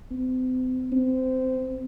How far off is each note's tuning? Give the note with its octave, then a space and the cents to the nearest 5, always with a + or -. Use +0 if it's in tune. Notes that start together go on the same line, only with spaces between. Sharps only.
C4 -40
C4 -20